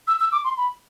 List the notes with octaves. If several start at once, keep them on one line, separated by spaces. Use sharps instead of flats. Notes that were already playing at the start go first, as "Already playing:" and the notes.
E6
E6
D6
C6
B5